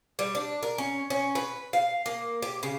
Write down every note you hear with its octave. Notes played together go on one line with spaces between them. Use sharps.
G3
D4
A#4
C#4
C#4
B4
F5
A#3
G4
C#3